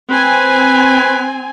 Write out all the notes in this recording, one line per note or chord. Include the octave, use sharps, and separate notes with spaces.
C4 B4 G#5